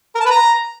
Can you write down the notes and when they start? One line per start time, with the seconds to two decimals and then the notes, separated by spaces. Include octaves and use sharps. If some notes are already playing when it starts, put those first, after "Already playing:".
0.15 A#4
0.20 A5
0.26 B4
0.31 A#5